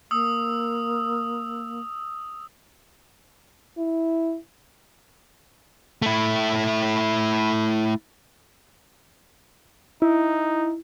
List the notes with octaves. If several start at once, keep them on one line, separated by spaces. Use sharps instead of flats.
A#3 D#6 E6
E4
A3 E4
D#4 E4